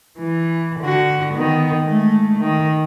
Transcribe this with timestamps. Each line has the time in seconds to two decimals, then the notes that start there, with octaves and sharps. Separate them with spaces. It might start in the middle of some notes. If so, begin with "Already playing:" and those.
0.19 E3
0.81 D3 F#4
1.34 D#3 B3
1.83 G#3 A3
2.39 D#3